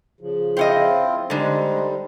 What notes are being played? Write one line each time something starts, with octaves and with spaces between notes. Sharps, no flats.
C#3 F3
C4 E4 F4 C5 C#5 D#5
D3 G3 G#3 D#4 A4 C5